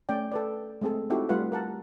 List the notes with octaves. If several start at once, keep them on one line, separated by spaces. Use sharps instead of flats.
A3 C#4 D5 G5
A4 B4 D5
G#3 A3 C4 G#4 A4
C4 D#4 E4 F#4 G4 A4
G3 A3 F4 B4 F5 F#5
A#4 F#5 A5